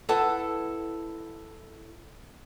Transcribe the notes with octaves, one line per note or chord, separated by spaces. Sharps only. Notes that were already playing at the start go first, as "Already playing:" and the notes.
E4 A4 B4 F#5 A5